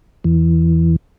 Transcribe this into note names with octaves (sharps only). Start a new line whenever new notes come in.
E2 E3